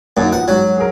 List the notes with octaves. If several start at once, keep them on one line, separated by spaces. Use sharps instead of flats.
F#2 A#3 D#4
F3 B3 F#5
G#2 F#3
G#4 A#4